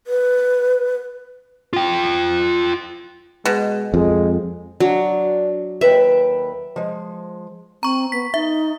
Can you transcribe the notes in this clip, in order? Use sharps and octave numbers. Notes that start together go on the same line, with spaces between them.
B4
F4 G5
B2 G#3
F2 G#3
F#3 D4
D#2 B4 E5 G5
F3 G#3
C4 A#5 C#6
B3 B6
D#4 E5